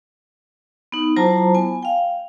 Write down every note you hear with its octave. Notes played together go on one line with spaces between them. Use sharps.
B3 D#4
F#3 E4 F4 C5 A5 A#5
B3 G#5
F5 G5